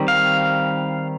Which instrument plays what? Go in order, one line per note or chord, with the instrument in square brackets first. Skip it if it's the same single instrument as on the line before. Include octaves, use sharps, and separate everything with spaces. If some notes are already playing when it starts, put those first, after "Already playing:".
Already playing: [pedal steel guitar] D#3 G3 C4
F5